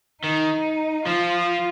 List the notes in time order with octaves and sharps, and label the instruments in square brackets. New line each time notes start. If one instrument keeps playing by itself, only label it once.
[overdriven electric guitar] D#3 [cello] D#4
[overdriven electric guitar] F3 [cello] F4